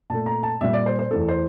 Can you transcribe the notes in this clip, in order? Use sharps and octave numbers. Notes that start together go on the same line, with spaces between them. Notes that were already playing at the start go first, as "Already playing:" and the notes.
A#2 A3 A5
A#5
A5
A#2 G3 E5
D5
C5
C5
E2 E3 A3 A4
C5